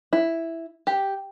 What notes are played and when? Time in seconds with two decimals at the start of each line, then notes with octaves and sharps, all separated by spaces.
0.13 E4
0.87 G4